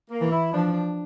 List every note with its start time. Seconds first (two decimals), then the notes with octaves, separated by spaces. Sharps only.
0.10 A#3
0.21 E3
0.31 E4
0.52 F3 D4
0.73 D4